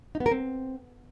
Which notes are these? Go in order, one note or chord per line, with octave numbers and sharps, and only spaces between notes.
D#4
B3
A#4
C4